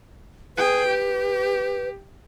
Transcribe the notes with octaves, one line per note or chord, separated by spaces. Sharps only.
G#4 B4 G5
G4